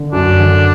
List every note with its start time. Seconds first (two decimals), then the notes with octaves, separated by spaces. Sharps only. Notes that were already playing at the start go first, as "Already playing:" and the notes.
Already playing: D3
0.12 F#2 D4
0.39 D3